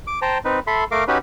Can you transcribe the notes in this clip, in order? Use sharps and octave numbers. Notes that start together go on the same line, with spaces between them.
D6
C5 G5 A5 A#5
C4 D#4 B4
A4 E5 B5 C6
A3 A#4 F5 D6
C#4 D#4 F#4 G4 B4 B5